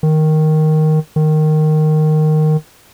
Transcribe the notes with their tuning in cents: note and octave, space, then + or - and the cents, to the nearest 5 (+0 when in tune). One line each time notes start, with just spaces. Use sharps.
D#3 +0
D#3 -10